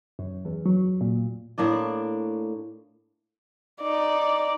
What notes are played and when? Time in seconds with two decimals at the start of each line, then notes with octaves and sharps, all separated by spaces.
0.19 F#2
0.45 E2
0.66 F#3
1.01 A#2
1.58 A2 A#3 D4 D5
3.81 D#4 D5